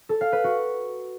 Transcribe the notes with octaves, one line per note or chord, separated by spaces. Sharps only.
A4
F5
B4
F#4